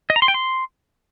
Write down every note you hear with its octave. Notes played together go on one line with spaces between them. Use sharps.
D#5
A#5
C6
G5
C6